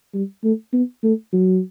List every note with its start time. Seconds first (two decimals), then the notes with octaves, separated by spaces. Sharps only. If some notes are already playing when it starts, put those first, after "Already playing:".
0.14 G3
0.44 A3
0.73 B3
1.04 A3
1.33 F#3